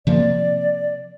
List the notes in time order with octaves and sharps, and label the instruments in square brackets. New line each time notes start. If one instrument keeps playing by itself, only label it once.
[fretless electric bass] C3 F3 A#3 [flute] D5